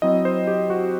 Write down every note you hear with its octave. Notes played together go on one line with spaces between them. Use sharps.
F#3 C4 E4 D#5
C5
G4
F#4